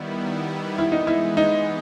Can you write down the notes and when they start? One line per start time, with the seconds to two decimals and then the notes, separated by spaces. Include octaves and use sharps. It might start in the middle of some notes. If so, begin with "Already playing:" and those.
Already playing: D#3 G3 B3 E4
0.78 E3 G#3 B3 E4
0.92 D#4
1.07 E4
1.37 D#4